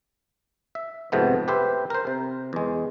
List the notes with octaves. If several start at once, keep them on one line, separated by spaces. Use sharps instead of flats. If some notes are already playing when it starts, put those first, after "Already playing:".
E5
F2 G#2 C3 A3 B3
G4 B4 C5 E5
A#4 C5
C3
E2 G#3